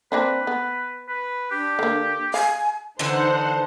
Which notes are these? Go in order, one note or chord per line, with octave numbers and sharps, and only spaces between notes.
A#3 C4 D4 B4
B3
B4
D4 G4
D3 A#3
F5 G#5
D3 E3 D#4 C5 F#5